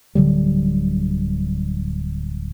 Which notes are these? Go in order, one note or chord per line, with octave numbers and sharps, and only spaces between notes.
D1 D3 F#3 G3